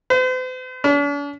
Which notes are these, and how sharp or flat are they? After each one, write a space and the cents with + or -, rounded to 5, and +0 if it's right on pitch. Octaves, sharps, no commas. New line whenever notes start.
C5 -45
D4 -45